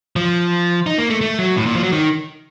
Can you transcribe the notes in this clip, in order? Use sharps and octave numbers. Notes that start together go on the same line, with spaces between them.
F3
D#4
A#3
A3
A3
F#3
A2
A#2
F3
F#3
D#3